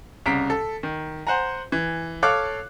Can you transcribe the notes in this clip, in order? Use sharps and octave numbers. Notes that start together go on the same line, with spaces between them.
C2 C#3 A#5 B6 D7
A4
D#3
C5 F#5 G#5 A#5
E3
A4 C#5 F5 D6 F6 F#6